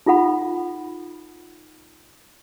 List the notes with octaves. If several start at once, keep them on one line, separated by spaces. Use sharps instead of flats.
D#4 F4 A4 F#5 B5